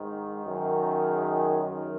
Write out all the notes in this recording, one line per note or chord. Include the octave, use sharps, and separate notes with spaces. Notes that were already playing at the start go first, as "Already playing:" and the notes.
Already playing: G#2 D#3
F#2 D#3
G#4
F#2 D#3